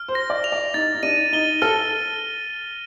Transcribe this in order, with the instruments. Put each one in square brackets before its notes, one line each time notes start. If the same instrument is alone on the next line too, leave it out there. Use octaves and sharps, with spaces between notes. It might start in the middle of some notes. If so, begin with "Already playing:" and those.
Already playing: [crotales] F6
[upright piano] C5
[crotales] A#6
[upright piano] D5
[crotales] F7
[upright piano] D5
[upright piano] D#4 [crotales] A6
[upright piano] D#4
[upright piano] D4 [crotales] D#7
[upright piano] D#4 [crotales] G7
[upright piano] A4 [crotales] F6